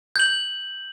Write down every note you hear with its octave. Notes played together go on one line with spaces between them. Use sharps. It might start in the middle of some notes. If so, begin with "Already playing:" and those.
G6 F#7